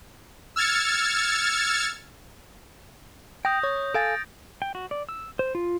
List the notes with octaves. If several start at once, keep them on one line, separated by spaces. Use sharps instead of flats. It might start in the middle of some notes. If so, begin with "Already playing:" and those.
E6 F6 G#6 A6 C#7
G5 D#6 G6 A#6
C#5
A4 F5 G#5 A6 D7
G5
F#4
D5
E6
C5
F4